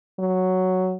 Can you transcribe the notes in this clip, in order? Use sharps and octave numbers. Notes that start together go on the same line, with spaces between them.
F#3